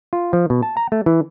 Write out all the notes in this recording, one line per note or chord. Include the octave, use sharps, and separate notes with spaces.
F4
F3
B2
A5
A#5
A3
E3